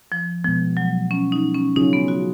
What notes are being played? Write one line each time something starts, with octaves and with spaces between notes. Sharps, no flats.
F3
B2 F3 G#3 B3
F#3
C#4
D#4
C#4
C#3 F#3 C#4 D#4 F4 G#4
B3
F#4